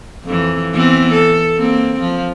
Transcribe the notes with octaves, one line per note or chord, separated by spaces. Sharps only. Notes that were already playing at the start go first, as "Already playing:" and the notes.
F2 E3
E3 B3 C4
A4
A#3 C4
F3